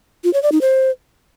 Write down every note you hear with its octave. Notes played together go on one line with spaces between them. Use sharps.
F4
C#5
D5
D#4
C5